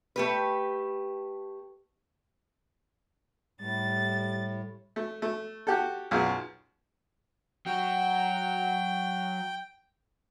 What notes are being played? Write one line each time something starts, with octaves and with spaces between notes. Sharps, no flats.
A3 G4 B4
A2 G3 A6
A3
A3
F#4 G4 A4
B1 F#2 F4 G#4
F#3 F#4 G5